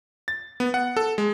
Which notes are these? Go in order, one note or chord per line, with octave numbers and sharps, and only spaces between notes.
A6
B3
F#5
A4
G#3